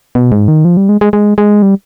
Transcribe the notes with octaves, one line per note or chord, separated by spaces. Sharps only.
B2
G#2
D#3
F3
G3
G#3
G#3
G#3
G#3
G3